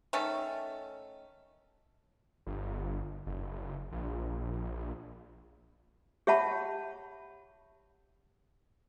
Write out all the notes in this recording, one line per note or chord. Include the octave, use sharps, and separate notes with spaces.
D#3 A3 C#4 A4
G1
F#1
A#1
G4 C#5 E5 F#5 A5 B5